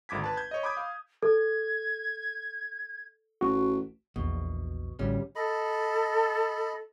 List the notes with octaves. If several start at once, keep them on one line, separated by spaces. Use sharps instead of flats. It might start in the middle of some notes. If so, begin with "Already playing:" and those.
G#1 D2 D6 G#6 B6
B4 A5
G6 G#6
C#5 D#5
B5 D6 D#6 G6 G#6
F5
A4 G#6
A1 F#4
A#1 E2 B2
A1 D2 G3 C#4
A4 D#5 B5